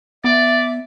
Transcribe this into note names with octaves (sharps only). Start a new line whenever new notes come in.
B3 D5 E5